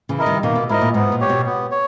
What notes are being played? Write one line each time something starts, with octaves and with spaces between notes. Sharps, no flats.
C#3 E3
E4 A#4 D#5
D#3 G3
B2 D#3 A#3
B2
G#2 E4 A#4 D#5
A#2
G#2 B3
A#2
G4 C#5
B2
B3
C#5